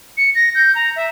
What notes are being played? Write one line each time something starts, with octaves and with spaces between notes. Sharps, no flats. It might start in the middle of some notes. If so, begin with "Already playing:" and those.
C#7
A#6
G6
A#5
E5